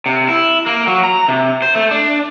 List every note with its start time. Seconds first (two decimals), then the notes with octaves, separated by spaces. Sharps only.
0.06 C3
0.29 E4
0.66 A#3
0.87 F#3
1.03 A#5
1.28 C3
1.62 C5
1.75 A3
1.91 D4